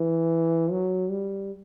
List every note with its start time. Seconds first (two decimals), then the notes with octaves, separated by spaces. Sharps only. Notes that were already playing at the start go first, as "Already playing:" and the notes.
Already playing: E3
0.71 F#3
1.10 G3